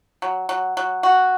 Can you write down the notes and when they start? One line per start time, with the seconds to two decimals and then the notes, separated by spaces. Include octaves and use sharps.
0.22 F#3
0.49 F#3
0.77 F#3
1.03 F#4